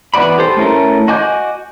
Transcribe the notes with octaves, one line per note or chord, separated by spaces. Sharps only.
E3 B3 F#4 D5 B5
G4 A4 C5
A3 C#4 E4 A4 A#4
F#4 D#5 G#5 D6 G6